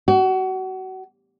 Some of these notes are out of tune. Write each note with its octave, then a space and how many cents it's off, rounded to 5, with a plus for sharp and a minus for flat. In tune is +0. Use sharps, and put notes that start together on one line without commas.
F#4 +30